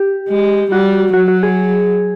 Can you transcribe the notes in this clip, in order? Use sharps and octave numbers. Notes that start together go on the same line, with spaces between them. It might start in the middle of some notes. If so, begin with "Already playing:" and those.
Already playing: G4
G#3
G3 F#4
F#3 F#4
F#4
G#4